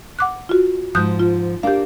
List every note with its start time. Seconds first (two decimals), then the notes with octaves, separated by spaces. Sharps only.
0.19 F#5 D6 F#6
0.49 F4 F#4
0.95 G#2 F3 D#6 F#6 G6
1.20 F4
1.63 A#3 D4 G4 F5